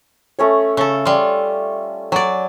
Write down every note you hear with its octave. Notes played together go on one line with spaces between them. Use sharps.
A3 C#4 C#5
C#3 A4
G3 F4
F#3 D5 G#5